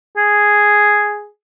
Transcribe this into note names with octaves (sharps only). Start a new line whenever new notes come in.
G#4